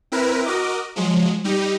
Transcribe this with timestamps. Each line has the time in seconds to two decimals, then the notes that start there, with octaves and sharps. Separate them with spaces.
0.12 C4 E4 A#4 B4
0.45 F#4 A#4 D#5 D6
0.96 F3 F#3 G#3
1.44 G3 D#4 G4